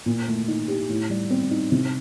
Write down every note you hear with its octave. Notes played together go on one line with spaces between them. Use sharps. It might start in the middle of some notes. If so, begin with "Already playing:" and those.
A#2
A3
D#4
G4
A2
G3
C4
D#4
C3